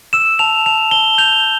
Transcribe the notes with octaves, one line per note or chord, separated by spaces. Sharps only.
E6 E7
A5 F7
A5 F7
A5 G7
G6 F7